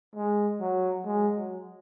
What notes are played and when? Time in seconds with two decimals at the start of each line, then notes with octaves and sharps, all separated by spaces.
0.16 G#3
0.61 F#3
1.06 G#3
1.36 F#3